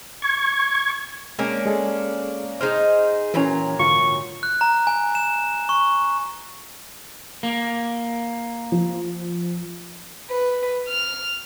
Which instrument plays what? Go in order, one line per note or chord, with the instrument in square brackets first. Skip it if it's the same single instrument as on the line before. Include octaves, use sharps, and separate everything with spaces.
[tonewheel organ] C#6 G#6
[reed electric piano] G#3 [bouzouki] A#3 C#4 D4
[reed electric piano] G#3 G#4 A4
[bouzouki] D#4 G#4 C5 [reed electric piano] F6
[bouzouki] A#2 F#3 A#5 [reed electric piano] E3 C#4
[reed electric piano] G#2 D3 F4 [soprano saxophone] C#6
[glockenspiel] F#6
A#5
G#5
E7
C#6
[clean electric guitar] A#3
[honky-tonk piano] F3
[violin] B4
F6